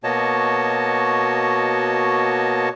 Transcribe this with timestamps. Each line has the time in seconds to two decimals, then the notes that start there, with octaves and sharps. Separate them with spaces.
0.04 B2 A#3 F#4 C#5 D#5 A5